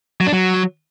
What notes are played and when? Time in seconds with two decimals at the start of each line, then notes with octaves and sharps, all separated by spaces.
0.21 F#3
0.27 D4
0.33 F#3